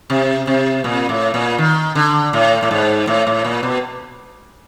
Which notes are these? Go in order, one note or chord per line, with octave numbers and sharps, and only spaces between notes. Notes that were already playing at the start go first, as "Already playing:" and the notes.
C3
C3
A#2
A2
A#2
D#3
D3
A2
A2
G#2
A2
A2
A#2
B2